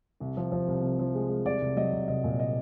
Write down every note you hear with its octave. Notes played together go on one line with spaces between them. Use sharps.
C2
F3
F3
C2
C3
F3
G#3
G#3
C2 D5
C2
F#3 D#5
C2
C2 D#5
A#2
D#5